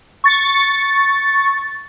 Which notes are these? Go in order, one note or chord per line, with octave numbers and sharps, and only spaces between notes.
C#6 A6